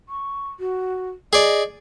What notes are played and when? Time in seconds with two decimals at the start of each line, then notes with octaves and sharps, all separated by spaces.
0.09 C#6
0.59 F#4
1.33 G#4 D5 D#5